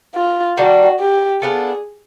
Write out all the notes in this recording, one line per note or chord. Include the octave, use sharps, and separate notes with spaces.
F4
D#3 G3 A#3 D4 F#4
G4
B3 D4 F4 G#4 A4